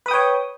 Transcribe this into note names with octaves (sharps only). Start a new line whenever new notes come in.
B4 C#5 G5 D#6